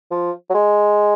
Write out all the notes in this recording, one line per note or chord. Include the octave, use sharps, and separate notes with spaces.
F3
F#3
G#3